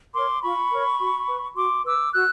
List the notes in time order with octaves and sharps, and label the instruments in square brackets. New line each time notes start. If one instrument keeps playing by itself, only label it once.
[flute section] A#4 C#5 C6 D6
F4 B5 C#6
A#4 C#5
F#4
B4
F#4 C6 D6
B4 D6 E6
F#4 E6 F#6